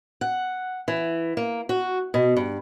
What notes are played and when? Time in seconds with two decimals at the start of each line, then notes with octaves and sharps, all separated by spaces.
0.21 F#5
0.88 E3
1.37 A#3
1.69 F#4
2.14 B2
2.36 G2